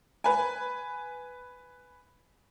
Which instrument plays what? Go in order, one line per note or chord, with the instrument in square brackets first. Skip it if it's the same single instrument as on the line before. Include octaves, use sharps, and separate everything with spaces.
[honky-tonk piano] B4 G#5